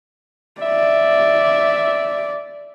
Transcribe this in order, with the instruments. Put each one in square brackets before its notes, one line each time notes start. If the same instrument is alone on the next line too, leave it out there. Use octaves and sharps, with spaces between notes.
[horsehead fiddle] D5 [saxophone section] E5